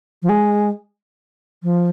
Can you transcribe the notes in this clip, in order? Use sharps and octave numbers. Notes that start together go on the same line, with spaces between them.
F3
G#3
F3